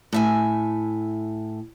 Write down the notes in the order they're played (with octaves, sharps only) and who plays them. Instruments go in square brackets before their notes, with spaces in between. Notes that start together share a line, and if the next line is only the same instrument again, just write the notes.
[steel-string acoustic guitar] A2 E5 G#5